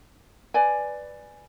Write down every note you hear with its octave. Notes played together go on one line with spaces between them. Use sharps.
B4 D5 G#5